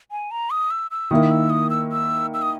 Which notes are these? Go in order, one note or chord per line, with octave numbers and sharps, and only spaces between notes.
G#5
A#5
D#6
E6
E6
D#3 A#3 E4 D#6
E6
D#6
E6
E6
E6
D#6